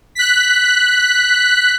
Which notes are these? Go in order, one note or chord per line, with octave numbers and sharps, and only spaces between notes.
F#6 B6